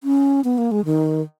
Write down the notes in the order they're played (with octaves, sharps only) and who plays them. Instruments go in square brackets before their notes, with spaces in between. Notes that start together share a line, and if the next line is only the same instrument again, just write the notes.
[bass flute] C#4
B3
A#3
G#3
D#3